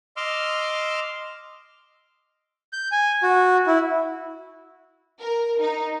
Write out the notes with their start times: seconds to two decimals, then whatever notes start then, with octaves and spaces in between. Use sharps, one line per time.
0.17 D#5 C6 D6 E6 F6
2.73 G6
2.92 G#5
3.23 F#4
3.67 E4
5.20 A#4
5.60 D#4